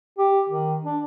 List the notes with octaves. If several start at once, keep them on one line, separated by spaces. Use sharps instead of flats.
G4
D#3
D4